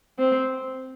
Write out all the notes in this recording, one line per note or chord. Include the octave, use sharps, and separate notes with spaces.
C4